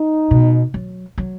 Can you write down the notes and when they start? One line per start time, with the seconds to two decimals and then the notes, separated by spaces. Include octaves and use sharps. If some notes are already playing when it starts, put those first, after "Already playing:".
Already playing: D#4
0.31 B2
0.74 F#3
1.18 F#3